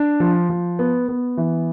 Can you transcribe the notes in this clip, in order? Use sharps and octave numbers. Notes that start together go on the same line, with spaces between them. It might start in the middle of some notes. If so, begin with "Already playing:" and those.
Already playing: D4
F3
F3
B3
B3
E3